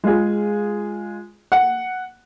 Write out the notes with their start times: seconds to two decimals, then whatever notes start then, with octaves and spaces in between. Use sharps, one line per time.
0.04 G#3 F4 G#4
1.52 F#5